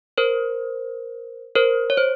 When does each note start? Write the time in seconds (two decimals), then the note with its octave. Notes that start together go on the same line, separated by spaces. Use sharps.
0.18 A#4 C5
1.55 A#4 C5
1.90 C#5
1.97 C5